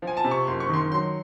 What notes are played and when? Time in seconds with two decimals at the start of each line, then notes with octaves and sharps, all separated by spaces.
0.02 F3
0.07 G#5
0.17 A5
0.24 C3
0.31 C#6
0.47 F#1 C6
0.60 C#6
0.69 D#3 C6
0.92 F#3 C6